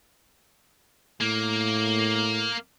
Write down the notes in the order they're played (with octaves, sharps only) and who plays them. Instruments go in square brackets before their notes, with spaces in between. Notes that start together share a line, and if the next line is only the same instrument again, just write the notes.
[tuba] A2 [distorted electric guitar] A#3